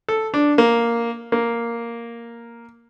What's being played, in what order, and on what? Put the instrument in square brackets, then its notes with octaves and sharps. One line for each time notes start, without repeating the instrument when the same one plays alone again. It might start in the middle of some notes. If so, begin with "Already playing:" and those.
[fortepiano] A4
D4
A#3
A#3